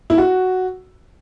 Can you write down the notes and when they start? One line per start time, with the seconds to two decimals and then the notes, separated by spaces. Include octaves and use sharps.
0.10 E4
0.18 F#4